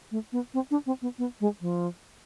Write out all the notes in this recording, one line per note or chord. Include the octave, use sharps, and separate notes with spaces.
A3
B3
C4
D4
C4
B3
B3
G#3
F3